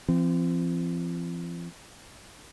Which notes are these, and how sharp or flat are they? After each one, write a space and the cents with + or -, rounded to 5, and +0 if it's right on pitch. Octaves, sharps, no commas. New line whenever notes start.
F3 -40 C4 +0